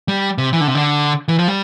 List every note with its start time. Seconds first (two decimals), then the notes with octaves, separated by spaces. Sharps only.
0.08 G3
0.38 C3
0.53 E3
0.61 D3
0.68 C3
0.75 D3
1.28 E3
1.39 F3
1.48 G3